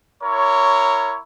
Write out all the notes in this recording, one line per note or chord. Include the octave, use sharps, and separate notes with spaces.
E4 A#4 C#5